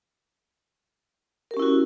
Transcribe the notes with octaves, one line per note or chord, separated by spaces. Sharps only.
C#4 E4 F#4 G4 A#4